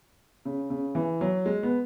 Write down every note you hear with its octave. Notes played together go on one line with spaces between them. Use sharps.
C#3
C#3
E3
F#3
G#3
B3